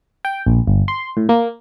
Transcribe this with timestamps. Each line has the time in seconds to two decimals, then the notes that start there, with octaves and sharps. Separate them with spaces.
0.25 G5
0.47 A#1
0.67 G1
0.88 C6
1.17 A2
1.29 A#3